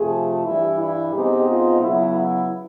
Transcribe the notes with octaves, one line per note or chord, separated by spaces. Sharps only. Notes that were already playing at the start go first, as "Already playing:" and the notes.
Already playing: F2 C3 F3 A3 G#4
G2 E3 G3 E4
E4
B2 G#3 C4 D#4 G4
F4
C#3 F#3 B3 E4
E4